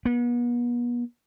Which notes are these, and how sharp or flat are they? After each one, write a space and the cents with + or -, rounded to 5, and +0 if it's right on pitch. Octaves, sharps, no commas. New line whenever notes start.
B3 -40